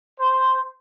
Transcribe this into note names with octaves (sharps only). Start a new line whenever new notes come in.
C5